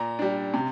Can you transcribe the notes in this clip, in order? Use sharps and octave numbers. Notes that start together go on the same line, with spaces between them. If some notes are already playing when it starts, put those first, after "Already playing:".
Already playing: A#2 A#5
G3 D4
C3